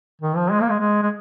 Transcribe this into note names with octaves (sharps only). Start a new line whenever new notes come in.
D#3
F3
G#3
A#3
G#3
G#3
G#3